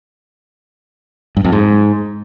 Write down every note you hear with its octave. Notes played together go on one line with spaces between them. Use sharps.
G2
F2
G#2